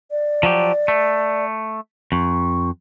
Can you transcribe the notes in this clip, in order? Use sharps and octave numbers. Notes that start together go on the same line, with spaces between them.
D5
F3 F#3 G4
A3
F2 C#6